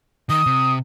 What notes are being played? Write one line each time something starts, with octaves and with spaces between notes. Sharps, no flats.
D#3 D#6
C3